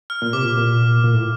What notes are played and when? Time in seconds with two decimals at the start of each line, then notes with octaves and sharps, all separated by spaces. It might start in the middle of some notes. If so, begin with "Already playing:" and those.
0.10 F6
0.22 A#2
0.33 C3 D6
0.45 A#2
0.57 A#2
1.04 A#2
1.14 A2